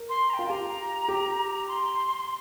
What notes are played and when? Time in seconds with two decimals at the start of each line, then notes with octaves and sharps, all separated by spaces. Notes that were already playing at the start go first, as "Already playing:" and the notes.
Already playing: A#4
0.09 C6
0.30 A#5
0.34 G5
0.39 F4
0.50 G4 A#5
1.08 G4
1.68 C6